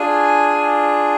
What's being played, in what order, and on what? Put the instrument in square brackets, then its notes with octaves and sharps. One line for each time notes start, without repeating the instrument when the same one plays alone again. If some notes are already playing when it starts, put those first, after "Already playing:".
Already playing: [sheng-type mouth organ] D4 F4 G#4 G#5